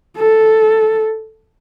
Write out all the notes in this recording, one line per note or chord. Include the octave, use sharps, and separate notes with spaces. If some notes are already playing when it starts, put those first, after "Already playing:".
A4